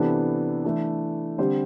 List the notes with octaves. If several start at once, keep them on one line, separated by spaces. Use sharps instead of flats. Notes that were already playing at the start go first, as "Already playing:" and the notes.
Already playing: C3 E3 B3 D4 A4
E3 A3 D4
D3 G3 C4 G4 C5